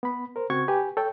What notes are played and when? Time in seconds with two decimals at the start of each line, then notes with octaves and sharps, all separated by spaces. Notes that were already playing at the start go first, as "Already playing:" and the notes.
0.03 B3 B5
0.36 A#4 C5
0.50 C#3 C4 F#4 C#6 G#6
0.68 G4 B4 G#5
0.97 A4 C#5 G5